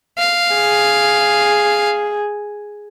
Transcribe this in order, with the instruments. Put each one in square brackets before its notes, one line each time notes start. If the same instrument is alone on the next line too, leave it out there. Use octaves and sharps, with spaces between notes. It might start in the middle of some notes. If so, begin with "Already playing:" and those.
[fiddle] F5
[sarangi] G#4